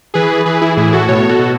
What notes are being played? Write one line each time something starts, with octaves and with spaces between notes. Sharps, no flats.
E3 G#4 B4
E3 G#4 B4
E4 G#4
A2 E4 G#4
F#4 A4
B2 A4 C#5
F#4 A4
B2